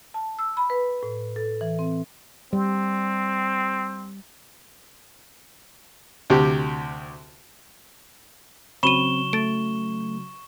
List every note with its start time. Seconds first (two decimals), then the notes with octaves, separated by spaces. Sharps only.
0.14 A5
0.39 E6
0.57 B5
0.70 B4
1.03 A2
1.36 A4
1.61 E3
1.79 C4
2.53 G3 C4
6.30 D2 C3 G4
8.83 C#3 F#3 C4 B5 C#6 D#7 E7 G7
9.33 A3 A6 D7